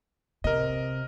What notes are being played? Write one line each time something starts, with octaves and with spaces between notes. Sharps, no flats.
C3 A#4 D#5